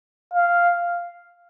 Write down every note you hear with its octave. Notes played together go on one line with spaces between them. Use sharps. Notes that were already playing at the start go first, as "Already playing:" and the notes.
F5